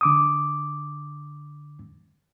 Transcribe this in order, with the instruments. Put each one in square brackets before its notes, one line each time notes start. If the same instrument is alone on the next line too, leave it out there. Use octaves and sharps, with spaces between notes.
[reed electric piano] D3 D6 D#6